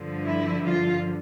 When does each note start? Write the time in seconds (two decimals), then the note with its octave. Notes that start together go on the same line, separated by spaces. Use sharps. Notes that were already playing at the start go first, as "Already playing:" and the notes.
Already playing: G2 D3 F3
0.26 E4
0.65 F4